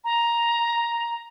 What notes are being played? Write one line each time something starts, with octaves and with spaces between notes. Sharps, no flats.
A#5